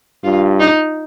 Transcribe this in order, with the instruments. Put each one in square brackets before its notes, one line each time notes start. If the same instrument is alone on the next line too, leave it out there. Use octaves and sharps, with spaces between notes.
[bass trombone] G2 [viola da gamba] F4
[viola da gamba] D#4